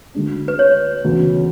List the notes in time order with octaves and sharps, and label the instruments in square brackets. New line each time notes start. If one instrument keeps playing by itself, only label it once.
[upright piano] D2 D3 G#3 D4
[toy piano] B4
C#5
[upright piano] E1 D2 C#3